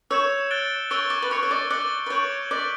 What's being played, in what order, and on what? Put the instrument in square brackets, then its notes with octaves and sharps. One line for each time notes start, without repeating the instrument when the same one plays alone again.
[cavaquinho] C#5 [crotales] E6 G6 C#7 E7
[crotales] F#6 A6 D7 G7
[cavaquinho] C#5 [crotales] C#6 E6 G6 D7 G7
[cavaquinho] D5
B4
[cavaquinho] C#5 [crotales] C#6 F#6 C#7
[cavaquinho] C#5
D5
[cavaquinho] D5 [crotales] F#6 C#7 G7
[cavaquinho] B4
[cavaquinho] C#5 [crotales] D6 G6 D7 F#7
[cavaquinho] D5 [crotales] F#6 B6 F#7